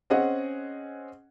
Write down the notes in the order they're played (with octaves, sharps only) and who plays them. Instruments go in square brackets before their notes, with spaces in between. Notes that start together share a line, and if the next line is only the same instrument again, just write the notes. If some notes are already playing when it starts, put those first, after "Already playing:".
[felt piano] C4 C#4 G#4 D#5 F#5